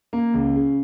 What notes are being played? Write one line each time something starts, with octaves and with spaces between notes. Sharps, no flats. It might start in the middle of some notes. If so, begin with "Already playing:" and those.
A#3
C#2
C#3